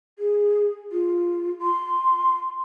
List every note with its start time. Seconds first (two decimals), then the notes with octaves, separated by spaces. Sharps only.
0.19 G#4
0.92 F4
1.61 C6